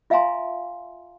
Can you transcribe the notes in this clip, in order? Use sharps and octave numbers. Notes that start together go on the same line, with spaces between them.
F4 E5 F5 G#5 A#5 C6